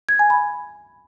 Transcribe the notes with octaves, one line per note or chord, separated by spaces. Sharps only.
G#6
G#5
B5